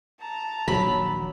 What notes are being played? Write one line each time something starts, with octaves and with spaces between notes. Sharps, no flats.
A5 A#5
D#1 A#1 D#2 F#3 B5